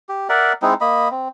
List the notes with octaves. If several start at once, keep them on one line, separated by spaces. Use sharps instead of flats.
G4
A#4 D5 E5 F#5
G#3 C4 D#4 E4
A#3 D#5 B5
C4